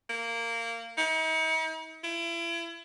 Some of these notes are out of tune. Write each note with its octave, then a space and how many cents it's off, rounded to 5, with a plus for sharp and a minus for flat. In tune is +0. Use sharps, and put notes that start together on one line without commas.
A#3 -15
D#4 +45
E4 +35